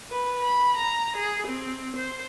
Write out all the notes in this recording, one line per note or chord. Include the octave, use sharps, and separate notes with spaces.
B4
B5
A#5
G#4
C4
C5